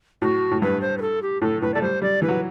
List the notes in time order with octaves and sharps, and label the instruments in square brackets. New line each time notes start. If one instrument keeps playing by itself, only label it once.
[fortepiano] A2 [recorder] F#4
[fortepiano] A2
[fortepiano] G2 [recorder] B4
[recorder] C5
B4
A4
G4
[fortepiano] A2 [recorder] A4
[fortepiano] A2 [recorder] B4
[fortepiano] A3 [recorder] D5
[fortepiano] G3 [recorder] C5
[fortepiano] G3 [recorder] D5
[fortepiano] E3 [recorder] B4
[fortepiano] F#3